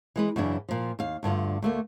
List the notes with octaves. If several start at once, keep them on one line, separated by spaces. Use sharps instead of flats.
E3 G#3 B4
F#2 C#3 E3 D4
A#2 F3
D#2 F5
D2 G2 D3 F4
D2 A3 A#3